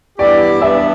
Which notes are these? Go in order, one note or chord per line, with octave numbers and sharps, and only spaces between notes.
G2 E3 B3 E4 G4 D5
G3 B3 D4 E5